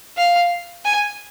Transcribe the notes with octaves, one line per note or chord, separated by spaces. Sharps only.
F5
G#5